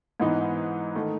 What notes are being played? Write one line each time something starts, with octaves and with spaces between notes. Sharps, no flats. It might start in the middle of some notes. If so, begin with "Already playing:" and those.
G#2 E3 B3 D#4
D#3 A3 D#4